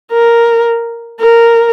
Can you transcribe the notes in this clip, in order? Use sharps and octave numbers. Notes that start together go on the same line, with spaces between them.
A#4
A#4